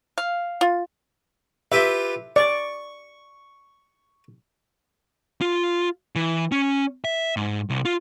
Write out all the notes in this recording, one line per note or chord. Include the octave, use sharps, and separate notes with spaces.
F5
F4
F4 G4 B4 E5
D5 C#6
F4
E3
C#4
E5
G#2
C2
F4